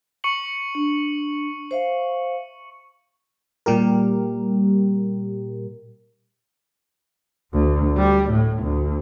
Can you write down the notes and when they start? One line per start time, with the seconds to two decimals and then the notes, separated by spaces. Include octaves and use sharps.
0.24 C#6 C#7 F#7
0.75 D4
1.71 C5 E5 F5
3.66 A#2 G3 G4 A#4
7.52 D2
7.97 G3
8.29 A2
8.63 D2